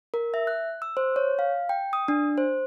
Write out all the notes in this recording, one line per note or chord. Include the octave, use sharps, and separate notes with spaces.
A#4
E5
F#6
E6
C5
C#5
F5
G5
D#6
D4
C5